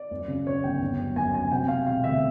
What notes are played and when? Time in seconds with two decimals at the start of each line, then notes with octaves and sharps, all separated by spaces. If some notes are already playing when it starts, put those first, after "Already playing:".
Already playing: D5
0.11 F#2
0.28 C#3
0.47 C#3 C#5
0.64 G1 G5
0.82 G1
0.99 F#3
1.16 F#2 G#5
1.34 F#3 G#5
1.51 C3 G5
1.68 C3 F5
1.87 E1 F5
2.04 D2 E5